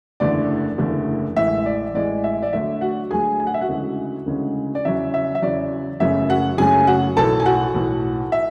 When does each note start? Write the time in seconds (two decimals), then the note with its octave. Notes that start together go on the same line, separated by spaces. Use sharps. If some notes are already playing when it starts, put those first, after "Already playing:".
0.20 F#1 E2 D3 A3 D5
0.78 F#1 E2 D3 A3
1.36 A1 A2 E3 G#3 E5
1.66 D5
1.94 A1 A2 E3 G#3 D5
2.24 E5
2.42 D5
2.53 D2 D3 F#3 A3 E5
2.81 F#4 F#5
3.11 D2 D3 F#3 A3 G#4 G#5
3.40 G#5
3.47 F#5
3.54 E5
3.61 F#4 F#5
3.68 D2 C#3 E3 G#3
4.26 D2 C#3 E3 G#3
4.75 D5
4.85 E2 C#3 F#3 E5
5.14 E5
5.35 E5
5.42 E2 C#3 F#3 D5
6.00 F#1 F#2 C#3 F#3 A3 E5
6.29 F#4 F#5
6.58 F#1 F#2 C#3 F#3 A3 G#4 G#5
6.87 F#4 F#5
7.17 B1 A2 E3 A4 A5
7.40 G#5
7.46 F#4 F#5
7.74 B1 A2 E3
8.32 E5